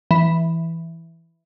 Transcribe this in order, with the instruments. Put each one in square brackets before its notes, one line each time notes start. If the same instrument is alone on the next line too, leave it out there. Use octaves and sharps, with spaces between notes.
[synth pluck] E3